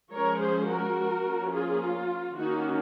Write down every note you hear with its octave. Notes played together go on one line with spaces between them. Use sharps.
F3 G#3 C#4 A#4 C#5
G#4 C5
F#4 A#4
F3 A#3 C#4
F4 G#4
F4
D#3 A#3 C#4 D#4 F#4